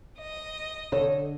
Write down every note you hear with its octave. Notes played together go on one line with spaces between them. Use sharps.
D#5
D3 A4 C#5